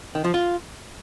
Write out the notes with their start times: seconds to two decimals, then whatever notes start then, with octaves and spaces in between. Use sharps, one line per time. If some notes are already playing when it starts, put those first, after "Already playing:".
0.15 D#3
0.24 F3
0.34 F4